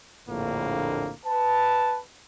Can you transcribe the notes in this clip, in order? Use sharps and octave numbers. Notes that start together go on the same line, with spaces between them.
A#1 F2 A2 D3 A#3
B4 A5